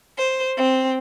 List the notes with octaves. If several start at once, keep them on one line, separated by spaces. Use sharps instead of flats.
C5
C4